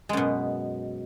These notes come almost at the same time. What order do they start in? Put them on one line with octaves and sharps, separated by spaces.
G#3 F#2 B2